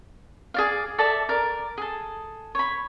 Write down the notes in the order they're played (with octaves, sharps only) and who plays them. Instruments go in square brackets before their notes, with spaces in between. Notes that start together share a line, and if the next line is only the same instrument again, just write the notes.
[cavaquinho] G#4 D5 F5
A4 D5 E5 A5
A#4 D5
G#4 A4
C#5 B5